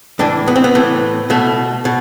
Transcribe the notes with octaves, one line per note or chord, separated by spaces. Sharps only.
A2 E3 D4
B3
C4
B3
A2 E3
B2 A3
B2